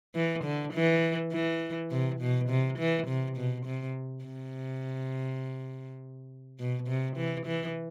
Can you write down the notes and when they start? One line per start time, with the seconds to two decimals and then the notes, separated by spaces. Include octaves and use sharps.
0.15 E3
0.45 D3
0.74 E3
1.33 E3
1.91 C3
2.20 B2
2.50 C3
2.79 E3
3.08 C3
3.37 B2
3.66 C3
4.25 C3
6.59 B2
6.88 C3
7.17 E3
7.46 E3